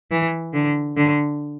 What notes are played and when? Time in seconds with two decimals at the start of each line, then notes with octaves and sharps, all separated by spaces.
0.11 E3
0.54 D3
0.97 D3